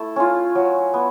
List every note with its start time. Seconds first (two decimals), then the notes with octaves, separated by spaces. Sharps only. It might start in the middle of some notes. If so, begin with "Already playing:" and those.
Already playing: A3 E4 A5
0.16 C#4 F4
0.55 F#3
0.94 B3